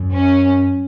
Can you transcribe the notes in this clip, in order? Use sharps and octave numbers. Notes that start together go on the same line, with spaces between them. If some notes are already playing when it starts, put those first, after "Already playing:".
Already playing: F#2
C#4